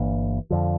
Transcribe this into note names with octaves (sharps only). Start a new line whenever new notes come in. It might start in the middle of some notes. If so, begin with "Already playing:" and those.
Already playing: G1 G2 E3 A#3
F2 D3 F3